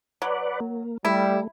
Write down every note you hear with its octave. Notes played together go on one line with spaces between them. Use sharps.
F#3 B4 D5 F#5
A#3
G3 A3 E4